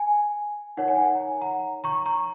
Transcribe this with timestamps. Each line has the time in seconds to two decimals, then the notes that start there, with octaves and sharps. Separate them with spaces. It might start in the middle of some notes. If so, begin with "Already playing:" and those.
Already playing: G#5
0.77 D#4 A#4 C#5 F#5
0.88 G#5
0.98 F#5
1.15 A#5
1.20 G#5
1.41 F#5 A#5
1.84 A#5 C#6
2.06 A#5 C#6